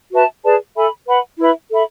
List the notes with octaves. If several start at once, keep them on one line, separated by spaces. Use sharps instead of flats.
F#4 B4 E5 A5
G#4 B4 D5 A5
A4 E5 G#5 B5
B4 F#5 B5
E4 B4 E5 B5
A4 E5 B5